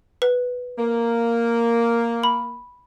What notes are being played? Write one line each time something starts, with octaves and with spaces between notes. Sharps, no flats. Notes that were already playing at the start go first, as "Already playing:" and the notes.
B4
A#3
B5